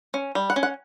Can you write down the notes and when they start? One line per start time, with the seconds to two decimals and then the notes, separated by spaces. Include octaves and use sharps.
0.14 C#4
0.35 G3
0.50 F#5
0.56 C#4
0.63 F#5